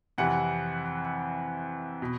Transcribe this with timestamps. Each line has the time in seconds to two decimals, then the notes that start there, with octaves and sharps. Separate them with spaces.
0.18 F2 C3 E3 F#5
2.02 B2